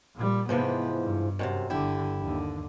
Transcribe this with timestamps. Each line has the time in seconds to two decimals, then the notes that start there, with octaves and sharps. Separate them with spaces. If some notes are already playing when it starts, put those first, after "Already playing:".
0.16 A#2 G3
0.49 G#2 C3 E3 F3 B3
1.02 G2
1.39 F#2 A2 C3
1.70 G1 D3 E4 G4
2.21 D#2 D3